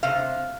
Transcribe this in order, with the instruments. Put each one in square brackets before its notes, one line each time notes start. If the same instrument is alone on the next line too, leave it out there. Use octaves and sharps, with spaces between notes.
[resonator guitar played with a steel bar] C3 F5